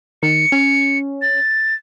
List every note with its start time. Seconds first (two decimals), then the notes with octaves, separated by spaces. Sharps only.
0.23 D#3 C#7
0.52 C#4
1.22 A6